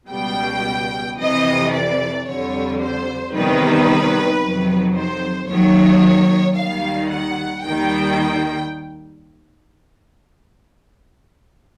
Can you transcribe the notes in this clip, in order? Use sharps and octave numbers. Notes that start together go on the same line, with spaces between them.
C#2 B2 G3 G5
F2 C3 E3 D#5
D5
F2 D3 G3 C#5
C5
E2 C3 D#3 G3 B4
F2 C3 D#3 F#3
C5
D#2 D#3 F#3 C#5
D#2 D#3 G3 F5
F#5
D#2 D#3 G3 G5